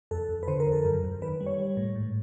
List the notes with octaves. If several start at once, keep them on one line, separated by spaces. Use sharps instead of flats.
F2 A4
F2
B4
D3 C5
A#4
F2
A4
F#2 A#4
F#2
D#3 B4
G3
C#5
G3
A2
G#2